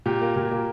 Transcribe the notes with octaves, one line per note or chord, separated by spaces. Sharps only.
A#2 G4
A#3
A#2
A#3